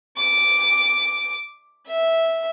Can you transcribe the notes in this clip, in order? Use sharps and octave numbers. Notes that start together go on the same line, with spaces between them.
D6
E5